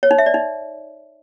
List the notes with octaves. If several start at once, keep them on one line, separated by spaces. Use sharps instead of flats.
C#5
D#4
E5
D5
D#4